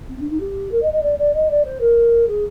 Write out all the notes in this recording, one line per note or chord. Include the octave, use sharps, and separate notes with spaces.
C4
D4
D#4
G4
A#4
D#5
D#5
D5
D5
D#5
D5
C5
A#4
G#4